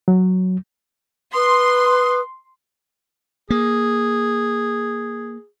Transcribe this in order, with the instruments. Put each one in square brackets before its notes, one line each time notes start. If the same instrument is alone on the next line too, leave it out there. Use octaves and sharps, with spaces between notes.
[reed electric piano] F#3
[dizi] B4 [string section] C6 [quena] D#6
[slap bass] A#3 [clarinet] G#4